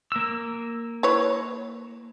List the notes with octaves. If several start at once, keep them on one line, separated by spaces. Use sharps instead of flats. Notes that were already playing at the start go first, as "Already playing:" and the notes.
A#3 E6
E4 B4 C#5